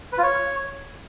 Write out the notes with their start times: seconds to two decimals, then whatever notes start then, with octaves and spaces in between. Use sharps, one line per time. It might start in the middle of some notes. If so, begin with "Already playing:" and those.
0.13 B4
0.18 F4
0.23 C#5